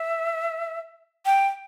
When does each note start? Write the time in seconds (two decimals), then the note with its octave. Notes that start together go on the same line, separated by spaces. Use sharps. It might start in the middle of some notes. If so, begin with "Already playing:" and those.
Already playing: E5
1.26 G5